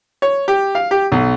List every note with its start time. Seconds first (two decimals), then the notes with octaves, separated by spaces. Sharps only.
0.22 C#5
0.48 G4
0.75 F5
0.91 G4
1.12 B1